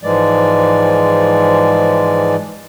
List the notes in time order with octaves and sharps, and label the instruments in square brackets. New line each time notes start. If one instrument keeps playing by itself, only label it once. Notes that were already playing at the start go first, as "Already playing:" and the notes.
[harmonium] G#2 E3 F3 G#3 D5